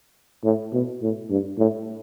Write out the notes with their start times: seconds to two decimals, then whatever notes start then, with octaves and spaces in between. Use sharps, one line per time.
0.44 A2
0.73 B2
1.02 A2
1.30 G2
1.58 A2